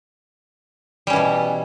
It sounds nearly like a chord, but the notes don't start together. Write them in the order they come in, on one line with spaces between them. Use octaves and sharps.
G3 C#4 E3 B2